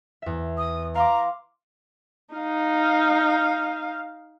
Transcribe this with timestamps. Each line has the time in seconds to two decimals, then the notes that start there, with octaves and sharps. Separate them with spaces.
0.22 E2 E5
0.58 D#6
0.95 F5 A#5 C6 D6
2.35 D#4 F5